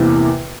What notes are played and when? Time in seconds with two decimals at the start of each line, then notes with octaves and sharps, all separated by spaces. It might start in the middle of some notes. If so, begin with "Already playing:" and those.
Already playing: E2 C3 E3 A#3